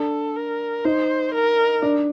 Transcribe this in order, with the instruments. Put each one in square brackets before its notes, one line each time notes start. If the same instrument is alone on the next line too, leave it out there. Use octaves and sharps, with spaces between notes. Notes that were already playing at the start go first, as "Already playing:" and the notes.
Already playing: [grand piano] D4 [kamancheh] A4
[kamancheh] A#4
[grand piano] D#4 [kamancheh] C5
[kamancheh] A#4
[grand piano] D4